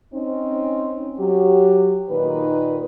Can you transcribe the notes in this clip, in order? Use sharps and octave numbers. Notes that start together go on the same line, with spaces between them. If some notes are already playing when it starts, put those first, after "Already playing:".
C4 C#4 D#4
F#3 G4
A#2 D#3 D#4 B4